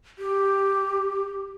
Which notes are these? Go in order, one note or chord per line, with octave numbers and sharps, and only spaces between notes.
G4